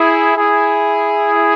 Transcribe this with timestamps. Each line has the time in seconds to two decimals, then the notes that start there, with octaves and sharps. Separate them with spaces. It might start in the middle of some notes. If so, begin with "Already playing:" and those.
Already playing: E4 G#4
0.37 E4 G#4